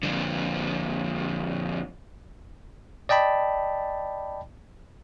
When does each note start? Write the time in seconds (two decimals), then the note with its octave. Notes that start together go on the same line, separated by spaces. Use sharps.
0.03 F2 D3
3.09 D5 D#5 G5 A5 B5